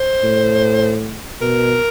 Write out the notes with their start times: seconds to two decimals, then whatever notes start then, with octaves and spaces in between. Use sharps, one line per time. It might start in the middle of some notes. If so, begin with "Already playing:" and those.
Already playing: C5
0.23 A2
1.42 B2 A#4